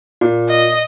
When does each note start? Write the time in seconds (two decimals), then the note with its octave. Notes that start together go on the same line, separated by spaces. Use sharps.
0.21 A#2
0.50 D#5